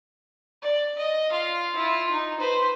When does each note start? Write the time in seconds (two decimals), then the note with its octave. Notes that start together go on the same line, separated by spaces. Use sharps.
0.62 D5
0.98 D#5
1.31 F4 F5
1.75 E4 F4
2.11 D#4
2.40 B4 C5